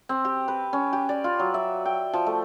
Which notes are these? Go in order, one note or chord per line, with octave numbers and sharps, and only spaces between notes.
C4
G4
B4
C#4
G4
D5
F4
F#3
E5
G5
F3
A3